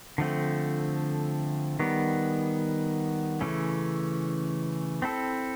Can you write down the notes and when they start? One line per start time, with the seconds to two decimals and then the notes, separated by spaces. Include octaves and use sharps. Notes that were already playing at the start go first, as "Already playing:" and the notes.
0.18 D3 F3 A3 C4
1.79 D#3 G3 B3
3.41 C#3 E3 A3 C#4
5.02 C4 E4 A4